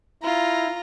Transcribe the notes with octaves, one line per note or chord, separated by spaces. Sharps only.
E4 F4 A#5